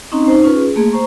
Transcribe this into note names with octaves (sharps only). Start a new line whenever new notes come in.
C4 C#4 D#4 D#5 A#5
D#4 C5
C#4 F4 B4
G#4
A3 A#3 G#4
C5 A#5 C#6